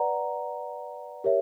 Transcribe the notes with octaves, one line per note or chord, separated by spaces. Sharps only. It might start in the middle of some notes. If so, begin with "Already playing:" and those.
Already playing: B4 D5 F#5 A#5
G4 A#4 C#5 E5